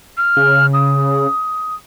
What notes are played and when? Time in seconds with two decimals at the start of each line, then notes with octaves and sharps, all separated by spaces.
0.17 F6
0.37 C#3
0.73 D#6